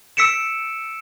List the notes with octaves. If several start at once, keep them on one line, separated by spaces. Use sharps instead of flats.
E6 B6 C#7 D7 E7